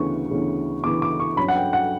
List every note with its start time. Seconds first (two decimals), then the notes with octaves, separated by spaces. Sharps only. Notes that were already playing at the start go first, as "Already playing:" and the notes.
Already playing: D2 C#3 E3 B3 C#6
0.30 D2 C#3 E3 B3
0.84 D2 C#3 E3 B3 D6
1.02 D6
1.20 C#6
1.37 G2 F#3 C#4 B5
1.48 F#5
1.56 G5
1.73 F#5